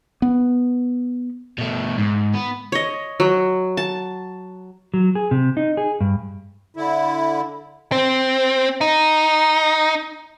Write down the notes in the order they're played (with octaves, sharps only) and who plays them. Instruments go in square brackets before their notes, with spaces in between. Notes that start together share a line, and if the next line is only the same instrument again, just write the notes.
[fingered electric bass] B3
[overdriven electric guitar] B2 A3
G#2
B3
[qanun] C#5 D#5
F#3
A5
[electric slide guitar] F#3
G#4
C3
D#4
G#4
G2
[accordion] D3 E4
[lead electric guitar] C4
D#4